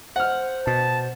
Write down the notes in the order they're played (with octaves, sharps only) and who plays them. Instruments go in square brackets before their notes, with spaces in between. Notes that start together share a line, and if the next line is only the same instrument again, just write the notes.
[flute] C5 [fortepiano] F#5 F6
[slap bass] B2 [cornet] A5